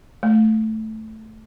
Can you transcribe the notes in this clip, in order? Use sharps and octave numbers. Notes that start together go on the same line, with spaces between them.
A3